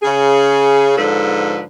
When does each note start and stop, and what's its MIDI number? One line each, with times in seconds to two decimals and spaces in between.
0.03 0.95 49
0.03 0.95 68
0.98 1.62 44
0.98 1.62 50
0.98 1.62 53
0.98 1.62 69
0.98 1.62 71